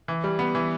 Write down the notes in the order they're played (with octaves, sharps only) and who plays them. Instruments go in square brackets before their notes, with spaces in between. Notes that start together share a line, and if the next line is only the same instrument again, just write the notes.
[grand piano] E3
G3
B3
E3